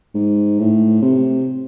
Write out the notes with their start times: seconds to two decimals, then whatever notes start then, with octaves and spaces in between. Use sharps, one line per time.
0.15 G#2
0.59 A2
1.02 C3